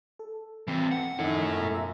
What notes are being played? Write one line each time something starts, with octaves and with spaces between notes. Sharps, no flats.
A4
E3 C4
F#5
F#2 D#3 F3 D#4 E4 A4
G#2 B2 A#5
F4 E5